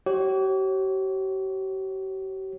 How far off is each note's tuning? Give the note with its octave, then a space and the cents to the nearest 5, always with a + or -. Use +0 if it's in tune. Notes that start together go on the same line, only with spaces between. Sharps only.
G4 -45 C#5 -30